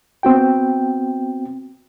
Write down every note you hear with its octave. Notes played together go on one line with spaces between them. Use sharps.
B3 C4 F#4 G5